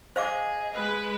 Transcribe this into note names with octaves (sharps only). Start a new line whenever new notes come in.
G#4 C5 D#5 F5 D6
G#3 B4